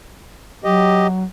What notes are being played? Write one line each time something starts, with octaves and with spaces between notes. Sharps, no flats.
F#3 G4 D#5